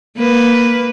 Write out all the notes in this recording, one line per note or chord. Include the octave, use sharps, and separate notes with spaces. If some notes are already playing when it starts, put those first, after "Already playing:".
A#3 B4